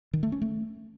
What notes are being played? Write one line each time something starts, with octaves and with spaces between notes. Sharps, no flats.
D#3
A3
C#4
A3